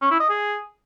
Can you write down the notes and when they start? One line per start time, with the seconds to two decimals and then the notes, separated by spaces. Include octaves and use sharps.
0.02 C#4
0.11 E4
0.20 D#5
0.29 G#4